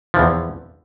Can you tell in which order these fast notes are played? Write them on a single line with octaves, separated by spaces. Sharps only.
F3 E3 E2